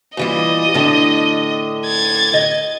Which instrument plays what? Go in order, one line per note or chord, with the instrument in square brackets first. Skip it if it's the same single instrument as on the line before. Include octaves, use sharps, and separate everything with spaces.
[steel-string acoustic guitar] A#2 E3 G3 [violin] D#5
[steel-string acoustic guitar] A2 D3
[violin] G#6 A6
[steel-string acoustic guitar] D#5